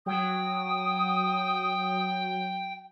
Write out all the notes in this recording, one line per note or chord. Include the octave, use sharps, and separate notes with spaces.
F#3 G5 D#6